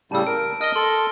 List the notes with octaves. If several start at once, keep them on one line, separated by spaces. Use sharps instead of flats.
A2 C#3 G3 A5 E6
A#4 D7
D#5 D#6 F6 G7
A4 C6